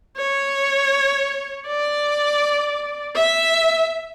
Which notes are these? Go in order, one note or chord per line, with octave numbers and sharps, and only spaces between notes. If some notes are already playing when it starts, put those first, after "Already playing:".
C#5
D5
E5